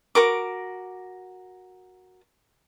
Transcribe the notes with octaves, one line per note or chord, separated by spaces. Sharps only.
F#4 A#4 D6